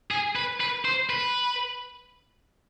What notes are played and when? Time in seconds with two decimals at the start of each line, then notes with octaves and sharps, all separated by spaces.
0.11 G#4
0.36 B4
0.60 B4
0.85 C5
1.10 B4